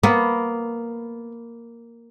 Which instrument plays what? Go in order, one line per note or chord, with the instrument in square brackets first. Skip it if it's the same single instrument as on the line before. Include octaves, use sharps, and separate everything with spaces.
[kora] A#3 [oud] B3